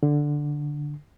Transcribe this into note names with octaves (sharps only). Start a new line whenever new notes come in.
D3